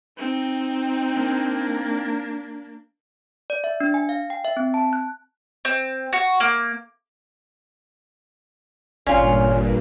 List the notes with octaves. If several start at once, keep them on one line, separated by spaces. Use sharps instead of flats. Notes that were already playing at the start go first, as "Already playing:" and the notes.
C4 D#4
A#3 D4
D5
E5
D4
G#5
F5
G5
E5
C4
A5
F#6
C4
F#4
A#3
G#1 G2 A#2 C#4 F4 D5 G#5